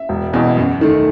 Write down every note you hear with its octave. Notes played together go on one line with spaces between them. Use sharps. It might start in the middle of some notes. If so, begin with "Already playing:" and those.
Already playing: E5
E1
E2 B2
F#2
D#3 A3